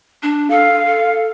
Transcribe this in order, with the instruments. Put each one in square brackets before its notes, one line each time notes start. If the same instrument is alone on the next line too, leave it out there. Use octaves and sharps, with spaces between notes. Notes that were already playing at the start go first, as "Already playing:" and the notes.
[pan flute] D4
[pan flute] A4 [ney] F5
[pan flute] A4